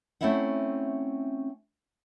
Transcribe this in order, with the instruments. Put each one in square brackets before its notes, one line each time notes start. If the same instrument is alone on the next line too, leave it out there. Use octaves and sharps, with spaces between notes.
[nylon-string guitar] A3 C4 C#4 E4 E5 F#5